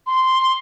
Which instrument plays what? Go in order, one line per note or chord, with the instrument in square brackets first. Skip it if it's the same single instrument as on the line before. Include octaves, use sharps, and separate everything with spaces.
[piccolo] C6